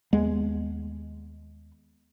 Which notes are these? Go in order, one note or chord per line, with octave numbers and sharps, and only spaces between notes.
D#2 G#3 B3